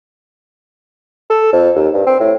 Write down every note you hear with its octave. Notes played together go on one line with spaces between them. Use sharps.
A4
F2
D#2
G2
C4
A2